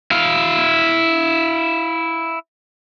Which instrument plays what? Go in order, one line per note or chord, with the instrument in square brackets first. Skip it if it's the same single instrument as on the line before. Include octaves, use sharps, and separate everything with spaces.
[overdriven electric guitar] E4 F5